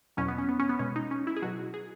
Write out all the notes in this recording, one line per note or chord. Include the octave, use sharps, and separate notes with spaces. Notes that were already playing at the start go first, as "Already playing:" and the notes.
E2 B2 F#3 C#4
B3
C#4
B3
C#4
B3
B2 G#3 C#4
D#4
C#4
E4
G#4
B2 F#3 F#4
G#4